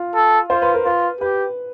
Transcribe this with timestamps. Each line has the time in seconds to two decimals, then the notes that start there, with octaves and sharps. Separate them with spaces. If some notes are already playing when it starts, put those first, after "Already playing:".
Already playing: F4
0.15 A4
0.49 F4 C5
0.62 B4
0.74 A#4
0.85 F4 B4
1.21 G4 B4